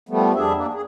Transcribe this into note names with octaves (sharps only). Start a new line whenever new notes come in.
F3 G3 A3 B3
F2 G3 D4 G#4 E5
A#3 D4
G#4